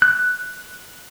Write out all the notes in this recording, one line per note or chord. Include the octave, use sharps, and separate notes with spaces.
F#6